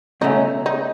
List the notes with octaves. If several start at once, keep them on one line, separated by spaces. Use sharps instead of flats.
C#2 B2 A3 C#4 D#4
D#4